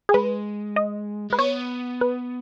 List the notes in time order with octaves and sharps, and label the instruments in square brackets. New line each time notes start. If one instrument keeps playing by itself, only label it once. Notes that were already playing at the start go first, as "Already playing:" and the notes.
[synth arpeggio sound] G#4
[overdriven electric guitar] G#3 [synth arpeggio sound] B4
[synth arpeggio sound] D#5
[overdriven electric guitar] G#3 [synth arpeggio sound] B4
[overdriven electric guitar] B3 [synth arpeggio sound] C#5
[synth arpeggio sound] B4